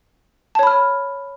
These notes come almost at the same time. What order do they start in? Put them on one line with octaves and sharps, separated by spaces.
A5 C#5 B5 F6